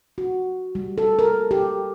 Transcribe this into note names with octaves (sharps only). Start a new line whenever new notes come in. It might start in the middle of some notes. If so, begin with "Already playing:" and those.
F#4
G3
A4
A#4
G4